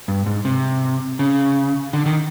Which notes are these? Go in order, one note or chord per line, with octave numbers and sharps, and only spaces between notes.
G2
G#2
C3
C#3
D3
D#3